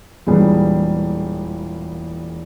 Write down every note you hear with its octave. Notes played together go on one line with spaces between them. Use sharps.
E1 A#2 E3 G3 G#4